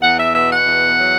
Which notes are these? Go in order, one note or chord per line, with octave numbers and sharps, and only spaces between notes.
E2 F#5
E5
B2 E5
F#5
E2
F#3